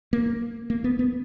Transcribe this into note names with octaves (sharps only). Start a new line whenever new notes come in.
A#3
A#3
B3
B3